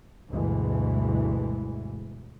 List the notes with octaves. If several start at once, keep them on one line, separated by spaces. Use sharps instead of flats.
D2 G2 B2 E3 G#3